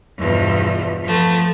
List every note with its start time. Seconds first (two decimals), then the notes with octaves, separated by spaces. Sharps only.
0.17 E2 G2 B2 F3
1.04 F3 A3 B3